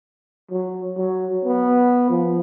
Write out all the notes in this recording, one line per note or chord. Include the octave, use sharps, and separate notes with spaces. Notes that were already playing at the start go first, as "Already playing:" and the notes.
F#3
F#3
B3
F3